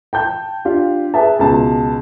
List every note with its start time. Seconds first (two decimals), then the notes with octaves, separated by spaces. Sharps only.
0.13 G5 A5 G6
0.65 D4 F4 G4
1.14 G#4 B4 E5 A5
1.39 C#2 B2 A5